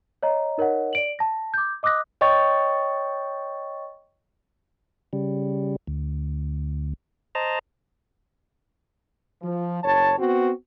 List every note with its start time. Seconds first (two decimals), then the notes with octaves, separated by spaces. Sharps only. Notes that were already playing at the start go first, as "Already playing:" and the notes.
0.23 C#5 D#5 A#5
0.58 D#4 A#4 C#5 D#5 F#5
0.93 D5 D7 F#7
1.19 A5 A#6
1.54 D6 G6
1.83 D#5 D6 D#6 F#6 A#6
2.21 C#5 D#5 G5 C#6 A6
5.13 C#3 G3
5.87 D2
7.35 C5 D#5 A5 A#5
9.42 F3
9.84 F#1 C#5 A5
10.19 B3 C4 F#4